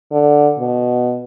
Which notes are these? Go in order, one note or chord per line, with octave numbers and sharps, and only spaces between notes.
D3
B2